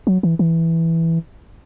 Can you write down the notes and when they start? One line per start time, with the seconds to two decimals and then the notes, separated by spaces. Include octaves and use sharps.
0.07 F#3
0.23 E3
0.39 E3